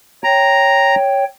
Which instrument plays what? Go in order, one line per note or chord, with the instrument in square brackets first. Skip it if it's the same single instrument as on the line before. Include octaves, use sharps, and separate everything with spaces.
[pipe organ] C#5 G5 [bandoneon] A#5